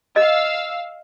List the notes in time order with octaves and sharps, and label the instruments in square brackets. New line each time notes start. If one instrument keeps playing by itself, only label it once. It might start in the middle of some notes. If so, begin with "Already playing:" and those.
[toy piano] D#5 [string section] F5 E6